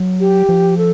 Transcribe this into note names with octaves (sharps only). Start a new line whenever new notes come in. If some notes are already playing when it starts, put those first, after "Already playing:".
Already playing: F#3
G4
F3
A4